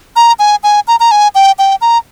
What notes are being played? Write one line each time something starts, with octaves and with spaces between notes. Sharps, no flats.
A#5
G#5
G#5
A#5
A#5
G#5
G5
G5
A#5